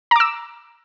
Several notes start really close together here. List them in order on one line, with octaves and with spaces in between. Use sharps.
A#5 D6 E6